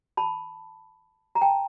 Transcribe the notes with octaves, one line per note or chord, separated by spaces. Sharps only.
A5 B5
A#5
G5 A5